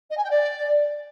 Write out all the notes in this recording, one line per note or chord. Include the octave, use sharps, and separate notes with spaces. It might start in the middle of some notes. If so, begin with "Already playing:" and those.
D#5
G#5
G5
D5